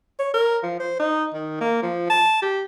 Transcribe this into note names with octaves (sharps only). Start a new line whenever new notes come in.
C#5
A#4
F3
C5
D#4
D#3
A#3
F3
A5
G4